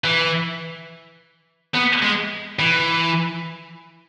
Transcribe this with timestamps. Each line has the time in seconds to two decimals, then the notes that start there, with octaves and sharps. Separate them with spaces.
0.04 E3
1.74 B3
2.02 G#3
2.59 E3